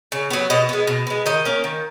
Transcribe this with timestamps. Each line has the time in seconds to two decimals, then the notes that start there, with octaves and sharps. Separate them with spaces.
0.12 C#3
0.30 F#3 B3
0.50 B2 D#5
0.69 G#3 B3
0.87 B2
1.07 G#3 B3
1.26 D#3 D#5
1.45 A#3 C#4
1.64 D#3